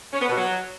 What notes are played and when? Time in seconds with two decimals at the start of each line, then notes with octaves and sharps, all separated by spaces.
0.13 C#4
0.21 B3
0.29 B2
0.37 F#3